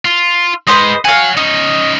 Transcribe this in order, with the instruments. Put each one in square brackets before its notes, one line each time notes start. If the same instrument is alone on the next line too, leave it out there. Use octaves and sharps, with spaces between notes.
[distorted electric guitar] F4
[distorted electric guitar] G#2 G#3 [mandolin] B4 C5 D#5
[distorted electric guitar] C#5 F#5 [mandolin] F5 G#5
[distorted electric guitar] C#4 D#4 [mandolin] D#5